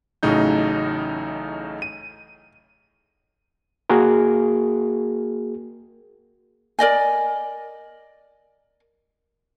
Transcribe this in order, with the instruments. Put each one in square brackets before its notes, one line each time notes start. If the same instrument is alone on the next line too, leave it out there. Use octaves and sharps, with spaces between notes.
[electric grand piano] A1 A2 C#3 F#3 D#4 G6
D#7
[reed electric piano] A#3 F#4 G#4 A#4
[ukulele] A#4 D5 D#5 G#5